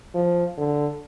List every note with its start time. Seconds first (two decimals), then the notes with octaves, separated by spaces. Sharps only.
0.15 F3
0.57 D3